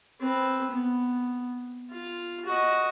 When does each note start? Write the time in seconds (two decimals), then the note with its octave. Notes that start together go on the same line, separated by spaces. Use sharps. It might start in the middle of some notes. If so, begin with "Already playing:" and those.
0.21 C4 B4
0.71 B3
1.91 F4
2.45 F#4 D#5